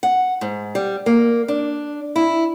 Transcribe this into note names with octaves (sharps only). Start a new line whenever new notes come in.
F#5
G#2
G3
A#3
D4
E4